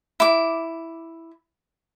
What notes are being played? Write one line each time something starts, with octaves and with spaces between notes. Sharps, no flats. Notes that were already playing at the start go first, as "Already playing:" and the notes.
E4 D6